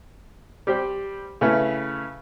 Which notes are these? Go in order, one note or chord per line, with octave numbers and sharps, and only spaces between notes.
G3 G4 C5 G5
C#3 A3 C#4 E4 B4